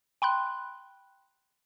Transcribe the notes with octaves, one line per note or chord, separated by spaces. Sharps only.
G5 B5 C6 F#6